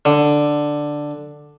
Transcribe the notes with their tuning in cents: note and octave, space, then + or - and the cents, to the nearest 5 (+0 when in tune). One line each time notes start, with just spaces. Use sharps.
D3 +5